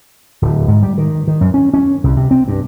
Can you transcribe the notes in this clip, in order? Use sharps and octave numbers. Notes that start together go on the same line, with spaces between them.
D1
G#2
G3
D#3
D#3
F#2
C#4
C#4
C2
C3
C4
G2